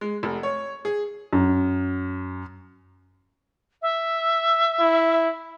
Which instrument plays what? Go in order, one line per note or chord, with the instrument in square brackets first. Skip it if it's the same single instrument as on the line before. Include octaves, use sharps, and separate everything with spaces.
[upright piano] G#3
F1
C#5
G#4
[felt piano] F#2
[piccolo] E5
[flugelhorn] E4